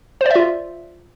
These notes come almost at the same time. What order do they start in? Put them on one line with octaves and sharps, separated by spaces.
C5 D5 E5 F4